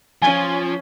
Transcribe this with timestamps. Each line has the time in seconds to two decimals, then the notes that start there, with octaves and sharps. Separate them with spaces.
0.22 F3 C#4 G#5